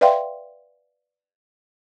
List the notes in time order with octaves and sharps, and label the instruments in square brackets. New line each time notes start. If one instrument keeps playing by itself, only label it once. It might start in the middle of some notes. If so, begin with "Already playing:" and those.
[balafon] B4 D5 E5 F5 G5 C6